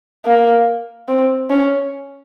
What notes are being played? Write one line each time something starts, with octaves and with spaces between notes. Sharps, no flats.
A#3
C4
C#4